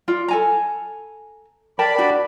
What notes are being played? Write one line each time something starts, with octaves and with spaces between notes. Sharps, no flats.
F4 D5
A4 G#5 A#5
A#4 D5 G5 A5 B5
D4 F#4 G4